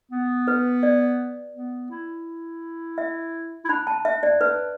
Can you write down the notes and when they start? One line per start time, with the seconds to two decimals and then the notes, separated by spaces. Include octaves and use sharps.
0.12 B3
0.48 B4
0.83 D5
1.54 B3
1.91 E4
2.98 E5
3.65 E4
3.69 D4 B5
3.87 A5
4.05 E5
4.23 D5
4.41 B4